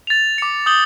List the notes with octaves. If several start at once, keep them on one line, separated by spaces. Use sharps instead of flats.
A6 F7
D6 C#7
D#6 G6 F#7 G7